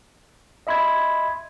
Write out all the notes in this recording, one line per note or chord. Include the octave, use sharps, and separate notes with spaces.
D#5 E5 B5 C6 G#6